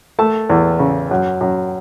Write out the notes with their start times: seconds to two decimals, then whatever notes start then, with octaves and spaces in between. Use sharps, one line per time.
0.18 A3 A5
0.49 E2
0.79 C#3
1.11 F#2
1.41 F#2